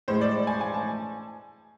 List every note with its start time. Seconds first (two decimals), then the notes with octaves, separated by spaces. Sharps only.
0.08 A2 G#3 C5
0.21 D5
0.47 G#5
0.61 G#5
0.74 A5